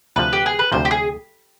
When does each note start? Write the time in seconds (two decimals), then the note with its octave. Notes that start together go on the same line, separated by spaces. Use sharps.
0.16 D2 C3 F3 B4
0.33 G4
0.46 G#4
0.59 B4
0.72 D2 C3 F3 C5
0.85 G4
0.91 G#4